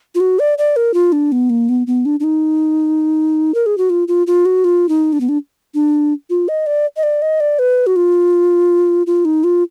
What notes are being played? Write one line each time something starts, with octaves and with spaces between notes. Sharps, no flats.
F4
F#4
D5
D5
A#4
F4
D4
B3
A#3
B3
B3
D4
D4
D#4
A#4
G#4
F#4
F4
F4
F4
F#4
F4
D#4
D4
B3
D4
D4
F4
D#5
D5
D#5
D5
D#5
D5
B4
F#4
F4
F4
D#4
F4